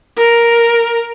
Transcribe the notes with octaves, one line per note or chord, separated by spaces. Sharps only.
A#4